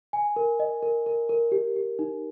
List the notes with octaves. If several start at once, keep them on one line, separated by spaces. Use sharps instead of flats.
G#5
A#4
D#5
A#4
A#4
A#4
G4
G4
D#4